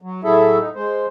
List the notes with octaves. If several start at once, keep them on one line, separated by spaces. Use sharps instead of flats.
F#3
A2 F#3 E4 G#4 A4 E5
D#4
G#3 C5